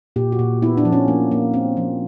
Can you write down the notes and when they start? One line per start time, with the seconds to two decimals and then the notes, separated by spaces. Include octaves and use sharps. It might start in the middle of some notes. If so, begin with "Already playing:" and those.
0.16 A#2 G4
0.32 F#4
0.39 A#2
0.62 B3 E4
0.78 D4
0.85 F3
0.92 C#4
1.08 A#3
1.32 A#3
1.54 C4
1.77 F3